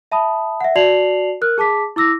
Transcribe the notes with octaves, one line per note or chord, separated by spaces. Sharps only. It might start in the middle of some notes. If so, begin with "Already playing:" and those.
E5 A5 B5 D#6
E5 F#5
F#4 D5 A5 C7 F7 F#7
A#4 F6 F#6
G#4 A5 D6 B6
E4 D6 E6 A#6